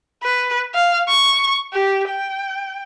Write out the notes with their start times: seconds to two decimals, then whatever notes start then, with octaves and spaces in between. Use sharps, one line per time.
0.23 B4
0.75 F5
1.08 C#6
1.73 G4
2.09 G5